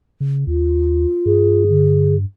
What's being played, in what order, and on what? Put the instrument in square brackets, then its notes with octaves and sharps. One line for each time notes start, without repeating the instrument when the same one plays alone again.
[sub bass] C#3
[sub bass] D#2 [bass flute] F4
[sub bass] G2 [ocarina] G#4
[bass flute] D3